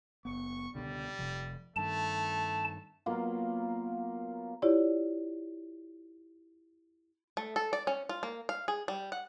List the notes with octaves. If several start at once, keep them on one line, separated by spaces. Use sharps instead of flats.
F#1 B3 C#6
C#2 B2 D3 G3
F1 C3 F3
G2 D#3 A3 A5
F#3 A#3 B3 F4
E4 F4 G4 C#5 D5
A3
A4
D5
C#4
F4
A#3
F5
G#4
G3
F#5